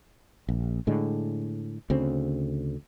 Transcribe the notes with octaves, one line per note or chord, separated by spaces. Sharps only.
A#1
A2 D3 G#3
D2 C#3 C4